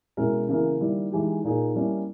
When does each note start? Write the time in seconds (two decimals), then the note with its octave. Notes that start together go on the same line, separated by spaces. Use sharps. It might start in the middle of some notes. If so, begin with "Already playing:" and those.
0.17 B2 G#3 C#4 E4 A#4
0.49 C#3 E3 A#3 E4 A#4
0.80 D#3 G3 A#3 E4
1.12 E3 G#3 D#4 G4
1.44 A#2 A#3 D#4 G#4
1.75 G3 A#3 C#4 E4